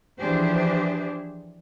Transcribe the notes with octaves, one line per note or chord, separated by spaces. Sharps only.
E3 F3 D4 G4 G#4 C5